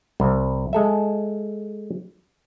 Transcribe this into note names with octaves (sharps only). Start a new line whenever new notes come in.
C2
G#3 A4 E5